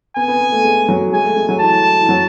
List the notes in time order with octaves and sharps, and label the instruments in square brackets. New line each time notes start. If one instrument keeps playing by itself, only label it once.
[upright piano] B3 [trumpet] G#5
[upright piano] B3
B3
A3
G#3
F#3
[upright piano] G#3 [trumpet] G#5
[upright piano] A3
G#3
F#3
[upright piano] E3 [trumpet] A5
[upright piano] E3
F#3